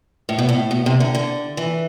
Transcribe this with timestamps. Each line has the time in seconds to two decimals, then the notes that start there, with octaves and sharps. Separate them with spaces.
0.29 A2
0.38 B2
0.49 A2
0.71 B2
0.86 C3
1.00 D3
1.15 D3
1.57 E3